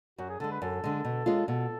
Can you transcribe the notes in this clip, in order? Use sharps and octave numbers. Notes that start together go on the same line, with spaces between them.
F#2 F#4
G#4
D3 G#3 A4
B4
F#2 A4
D3 G#3
B2
G#3 C#4 F4
B2 A4